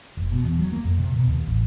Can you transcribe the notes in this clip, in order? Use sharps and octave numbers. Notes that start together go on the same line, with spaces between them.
F1
B2
E2
F#3
A#3
F2
C3
B2
D#2
A1